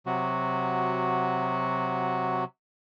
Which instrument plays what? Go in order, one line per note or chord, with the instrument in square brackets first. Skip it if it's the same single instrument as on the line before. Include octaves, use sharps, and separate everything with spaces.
[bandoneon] C3 F#3 F#4